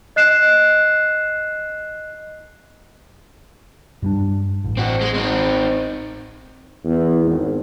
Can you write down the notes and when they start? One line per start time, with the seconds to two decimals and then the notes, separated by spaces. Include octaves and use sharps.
0.16 D#5 F#6 C7 E7
4.02 G2 G3 D4
4.64 A1
4.77 C4 F#4
5.01 G#3
5.14 C4 D#4
6.85 E2
7.25 G#1